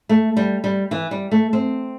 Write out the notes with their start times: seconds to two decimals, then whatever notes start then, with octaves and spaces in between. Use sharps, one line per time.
0.09 A3
0.37 G3
0.64 G3
0.91 E3
1.11 G3
1.32 A3
1.53 C4